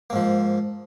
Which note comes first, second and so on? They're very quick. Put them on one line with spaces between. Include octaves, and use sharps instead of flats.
A#3 G#2 F3